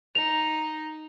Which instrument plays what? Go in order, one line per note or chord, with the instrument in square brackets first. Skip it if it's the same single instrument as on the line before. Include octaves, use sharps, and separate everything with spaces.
[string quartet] D#4 [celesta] F7